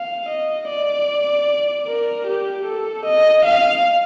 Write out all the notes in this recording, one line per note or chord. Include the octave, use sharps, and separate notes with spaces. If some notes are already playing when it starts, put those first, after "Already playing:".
Already playing: F5
D#5
D5
A#4
G4
A4
D#5
F5